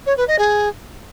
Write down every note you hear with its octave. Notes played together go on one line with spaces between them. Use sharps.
C#5
B4
D#5
G#4